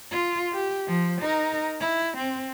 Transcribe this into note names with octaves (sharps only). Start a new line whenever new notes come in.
F4
G4
F3
D#4 A#4
E4
C4